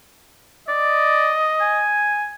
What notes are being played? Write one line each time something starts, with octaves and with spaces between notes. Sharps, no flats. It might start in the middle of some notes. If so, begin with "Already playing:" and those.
D5 D#5
G#5